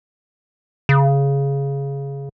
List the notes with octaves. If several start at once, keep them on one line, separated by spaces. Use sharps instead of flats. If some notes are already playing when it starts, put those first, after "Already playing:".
C#3